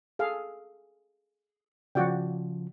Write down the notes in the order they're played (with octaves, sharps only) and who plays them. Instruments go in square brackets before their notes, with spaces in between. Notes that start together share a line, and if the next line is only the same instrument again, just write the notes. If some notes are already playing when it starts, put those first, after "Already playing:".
[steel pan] G#4 A4 F5
[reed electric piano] C#3 F3 [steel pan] F#4 D5 G5